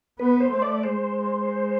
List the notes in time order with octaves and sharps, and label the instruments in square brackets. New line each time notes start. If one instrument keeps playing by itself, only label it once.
[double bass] B3 [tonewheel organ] B4
[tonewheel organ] C5
[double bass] A3
[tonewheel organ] D5
[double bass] G#3 [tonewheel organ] C5